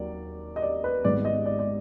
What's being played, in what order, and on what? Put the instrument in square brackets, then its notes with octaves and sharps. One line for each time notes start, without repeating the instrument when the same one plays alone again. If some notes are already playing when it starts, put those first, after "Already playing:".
Already playing: [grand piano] D#2 D#3 F#3 A#3 D5
D#5
D5
B4
G#1 G#2 D#3 G#3 B3 D5
D#5
D5
D5